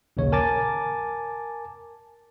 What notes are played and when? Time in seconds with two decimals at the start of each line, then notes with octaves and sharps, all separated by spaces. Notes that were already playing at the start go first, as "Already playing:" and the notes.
0.17 A#1 D#2 C#3 C#5
0.32 A#4 G#5 A5 D6 A6